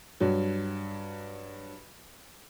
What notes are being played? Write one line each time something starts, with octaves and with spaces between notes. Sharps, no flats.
G2 F#3